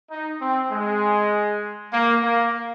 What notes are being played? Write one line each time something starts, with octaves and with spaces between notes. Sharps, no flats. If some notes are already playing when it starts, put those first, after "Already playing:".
D#4
C4
G#3
A#3
A#3